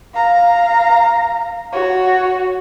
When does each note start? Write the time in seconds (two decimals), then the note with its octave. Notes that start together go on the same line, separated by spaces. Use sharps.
0.14 F5 A#5
1.72 F#4 C#5